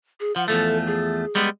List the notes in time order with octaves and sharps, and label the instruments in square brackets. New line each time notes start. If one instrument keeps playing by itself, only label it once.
[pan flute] G#4
[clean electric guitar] F3 [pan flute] F#5
[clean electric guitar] E2 F3 A3 [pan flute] A4
[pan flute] G#4
[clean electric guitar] G3 G#3 B3